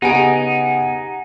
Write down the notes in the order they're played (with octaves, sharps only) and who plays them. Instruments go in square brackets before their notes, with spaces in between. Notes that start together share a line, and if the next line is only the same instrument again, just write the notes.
[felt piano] C#3 B3 [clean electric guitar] D#4 [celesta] G4 [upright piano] F#5 G#5 D7